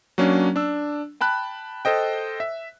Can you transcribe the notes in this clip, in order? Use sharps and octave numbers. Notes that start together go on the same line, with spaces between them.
F#3 A#3 C#4 D4
D4 E6
G5 A5 B5 F#6
A4 C5 D#5 G5
E5